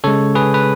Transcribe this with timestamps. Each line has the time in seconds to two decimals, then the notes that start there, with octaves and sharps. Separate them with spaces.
0.04 C#3 G#3 A4 C#5
0.35 G#4 B4
0.54 B4